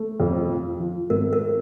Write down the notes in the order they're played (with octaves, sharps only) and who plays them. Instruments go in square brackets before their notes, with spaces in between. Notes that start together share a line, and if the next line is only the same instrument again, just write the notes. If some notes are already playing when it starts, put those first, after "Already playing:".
Already playing: [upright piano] A3
F2
F3
F3
[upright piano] G#1 [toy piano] A#4
[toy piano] A#4